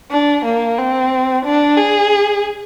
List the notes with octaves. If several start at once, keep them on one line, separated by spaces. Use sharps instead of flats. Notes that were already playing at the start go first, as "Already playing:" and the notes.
D4
A#3
C4
D4
G#4